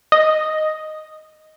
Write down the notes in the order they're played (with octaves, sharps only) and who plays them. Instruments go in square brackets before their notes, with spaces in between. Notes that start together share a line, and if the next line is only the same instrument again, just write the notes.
[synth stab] D#5